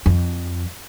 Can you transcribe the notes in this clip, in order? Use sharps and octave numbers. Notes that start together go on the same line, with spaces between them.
F2